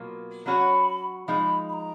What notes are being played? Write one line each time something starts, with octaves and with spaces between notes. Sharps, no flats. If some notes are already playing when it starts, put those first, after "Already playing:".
Already playing: B2 F#3 A#3 F4
F#3 C#4 F#4 C#5 B5
F3 G#3 D#4 B5
B5
A#5